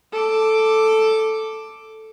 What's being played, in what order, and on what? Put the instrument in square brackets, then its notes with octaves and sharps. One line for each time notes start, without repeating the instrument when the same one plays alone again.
[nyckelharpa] A4 D6